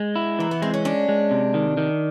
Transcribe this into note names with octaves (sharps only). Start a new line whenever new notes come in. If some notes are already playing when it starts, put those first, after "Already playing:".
Already playing: G#3
E4
E3 A#3
B3
G#3 C4
C#4
C#4 D4
G#3
C3
D#3
D#3